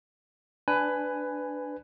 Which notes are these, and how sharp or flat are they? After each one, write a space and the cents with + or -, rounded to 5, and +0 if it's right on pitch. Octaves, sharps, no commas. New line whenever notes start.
D4 +0 B4 +15 G#5 +0